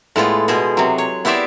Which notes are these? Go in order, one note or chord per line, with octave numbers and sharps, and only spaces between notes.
A2 G#3 B3 F4
B2 G#3 G#4
C3 F#3
C#5
B3 E4 G4 C5 D5 E5